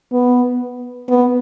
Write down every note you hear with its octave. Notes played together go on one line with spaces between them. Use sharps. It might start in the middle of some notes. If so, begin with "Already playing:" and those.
B3
B3